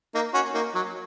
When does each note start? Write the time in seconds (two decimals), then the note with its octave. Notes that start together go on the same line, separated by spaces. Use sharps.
0.15 A#3 D#4
0.34 C#4 F#4
0.54 A#3 D#4
0.75 F#3